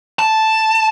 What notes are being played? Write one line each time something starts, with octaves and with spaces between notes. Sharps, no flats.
A5